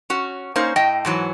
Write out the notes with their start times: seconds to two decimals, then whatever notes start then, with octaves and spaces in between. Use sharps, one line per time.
0.10 C#4 F#4
0.56 A#3 C#4 D#4 C5
0.76 A2 D#5 G5
1.05 G#2 E3 F#3